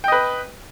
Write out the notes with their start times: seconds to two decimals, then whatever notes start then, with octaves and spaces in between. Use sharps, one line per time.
0.04 G5
0.08 D#5
0.12 B4